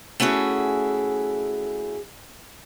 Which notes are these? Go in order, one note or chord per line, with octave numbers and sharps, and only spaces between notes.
A3 C#4 E4 F#4 G#4